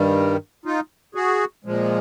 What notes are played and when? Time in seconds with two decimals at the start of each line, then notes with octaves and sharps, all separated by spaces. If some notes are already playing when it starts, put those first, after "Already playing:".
Already playing: G2 D#3 G3
0.65 D#4 F4
1.15 F#4 G#4
1.65 A#2 F3 G#3